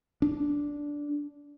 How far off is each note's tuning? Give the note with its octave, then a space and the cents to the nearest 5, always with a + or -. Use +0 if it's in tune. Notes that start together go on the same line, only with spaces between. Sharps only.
D4 -10